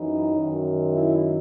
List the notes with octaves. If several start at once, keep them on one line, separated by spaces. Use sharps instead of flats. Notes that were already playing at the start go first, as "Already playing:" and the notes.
Already playing: F#2 E3 D#4
F#2 D#3
E4